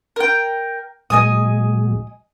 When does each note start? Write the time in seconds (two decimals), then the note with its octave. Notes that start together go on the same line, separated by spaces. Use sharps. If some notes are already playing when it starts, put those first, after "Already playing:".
0.16 A#4 G5
1.10 A#2 F#3 G#3 D#5 G#5 D#6